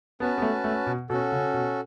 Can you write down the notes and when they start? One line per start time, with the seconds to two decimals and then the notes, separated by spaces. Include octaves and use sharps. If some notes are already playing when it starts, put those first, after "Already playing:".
0.20 B3 C#4 F#4 B4 A5
0.38 B3
0.42 A3
0.64 A3
0.87 B2
1.10 B2 C#4 F#4 A4
1.32 C#3
1.54 B2